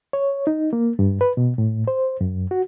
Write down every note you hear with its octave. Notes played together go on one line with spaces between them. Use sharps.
C#5
D#4
A#3
G2
B4
B2
A2
C5
F#2
F#4